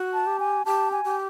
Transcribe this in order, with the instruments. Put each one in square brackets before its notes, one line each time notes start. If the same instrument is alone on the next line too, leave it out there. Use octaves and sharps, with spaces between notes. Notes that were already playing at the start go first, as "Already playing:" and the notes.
Already playing: [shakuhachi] F#4
[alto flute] A5
[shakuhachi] G4
[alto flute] G#5
[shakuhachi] G4 [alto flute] A5
[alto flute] G#5
[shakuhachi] G4